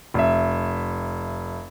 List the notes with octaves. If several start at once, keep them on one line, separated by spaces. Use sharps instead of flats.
F1 E5